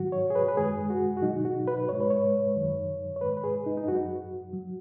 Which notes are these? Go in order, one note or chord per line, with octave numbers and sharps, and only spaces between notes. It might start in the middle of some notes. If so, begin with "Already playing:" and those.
Already playing: G#2 D#3 F#3 F#4
C#5
G#4
B4
B4
F#2 D#3 G#3 G#4
F#4
F#4
B2 F#3 D#4
F#4
B4
G#2 G#3 C#5
B4
C#5
F#2 D#3 F#3
C#5
G#2 G#3 B4
B4
G#4
D#4
D#4
F#2 F#3 F#4
F#3